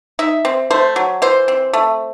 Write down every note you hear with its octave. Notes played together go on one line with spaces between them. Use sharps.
D#4 E5
C4
A3 C5
F#3
E3 C5
C4
A3